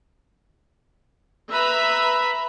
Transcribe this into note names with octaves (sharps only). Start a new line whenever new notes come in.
B4 E5 A#5 B5